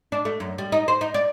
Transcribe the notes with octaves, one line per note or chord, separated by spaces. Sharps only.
D4
A3
F#2
G3
D#4
C5
D#4
D5